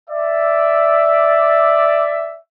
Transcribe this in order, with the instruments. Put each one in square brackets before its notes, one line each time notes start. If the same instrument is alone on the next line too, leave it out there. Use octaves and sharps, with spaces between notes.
[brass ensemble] D5 E5